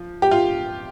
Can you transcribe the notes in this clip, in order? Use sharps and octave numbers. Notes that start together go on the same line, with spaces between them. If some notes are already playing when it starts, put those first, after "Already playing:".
Already playing: F3
G4
F4